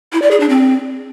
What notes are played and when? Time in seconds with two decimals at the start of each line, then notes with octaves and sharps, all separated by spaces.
0.13 E4
0.22 D5
0.31 G#4
0.40 D4
0.49 C4